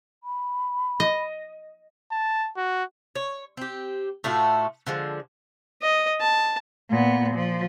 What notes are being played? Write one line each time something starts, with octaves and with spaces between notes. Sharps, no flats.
B5
D#5
A5
F#4
C#5
C4 G4
A2 A3 F4 F#4
D3 F3 G#3
D#5
A5
A#2 B3
F3